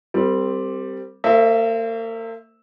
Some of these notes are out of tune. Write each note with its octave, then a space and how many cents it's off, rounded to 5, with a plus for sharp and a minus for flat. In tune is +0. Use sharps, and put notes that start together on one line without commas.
G3 +0 C4 +0 A#4 -40
A#3 -45 C5 +0 E5 -5